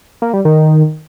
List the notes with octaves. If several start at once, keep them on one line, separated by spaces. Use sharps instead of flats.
A#3
G3
D#3